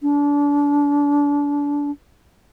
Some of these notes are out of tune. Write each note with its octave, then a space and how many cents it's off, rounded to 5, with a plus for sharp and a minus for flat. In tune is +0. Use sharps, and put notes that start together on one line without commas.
D4 -30